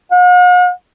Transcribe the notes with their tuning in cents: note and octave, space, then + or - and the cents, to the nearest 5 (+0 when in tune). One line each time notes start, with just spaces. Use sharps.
F#5 -45